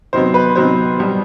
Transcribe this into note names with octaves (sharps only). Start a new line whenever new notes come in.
C3 D#3 F#3 B3 C5
B4
C3 D#3 F#3 B3 C5
B2 G3 B3